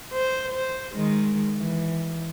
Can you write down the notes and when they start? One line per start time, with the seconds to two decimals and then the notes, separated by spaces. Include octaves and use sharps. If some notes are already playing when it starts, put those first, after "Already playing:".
0.12 C5
0.53 C5
0.94 D#3 G#3
1.57 E3